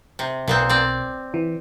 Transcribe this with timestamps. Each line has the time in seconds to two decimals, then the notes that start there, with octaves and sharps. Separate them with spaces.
0.19 C3
0.48 B1 A#2 B3 C4
0.69 C4 D5
1.34 E3